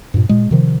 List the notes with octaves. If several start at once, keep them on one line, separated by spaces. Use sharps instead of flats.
G2 A#2
A#2 G#3
C3 D#3 F3